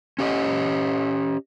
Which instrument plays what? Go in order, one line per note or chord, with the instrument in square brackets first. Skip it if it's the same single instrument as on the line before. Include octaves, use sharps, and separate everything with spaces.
[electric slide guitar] C#4 G4 C#5 D#5